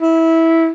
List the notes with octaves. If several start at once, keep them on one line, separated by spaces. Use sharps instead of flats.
E4